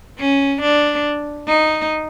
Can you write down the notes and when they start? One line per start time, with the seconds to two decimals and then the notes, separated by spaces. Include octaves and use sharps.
0.19 C#4
0.62 D4
1.48 D#4